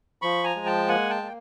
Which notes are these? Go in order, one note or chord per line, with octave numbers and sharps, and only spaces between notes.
F3 B5 C#6
G#5 A#5
G#3
G5 A5
A#3 F#5 G#5
G5 A5
A#3